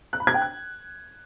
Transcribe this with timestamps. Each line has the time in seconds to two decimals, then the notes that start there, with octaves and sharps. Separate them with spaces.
0.13 F#6
0.20 B5
0.27 G#6
0.34 G5
0.41 F#6